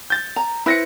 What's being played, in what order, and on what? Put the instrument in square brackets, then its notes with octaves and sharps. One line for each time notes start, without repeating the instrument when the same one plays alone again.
[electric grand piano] G6 A6
[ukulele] A#5
[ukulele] E4 B4 C5 [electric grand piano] B5 A#6 C#7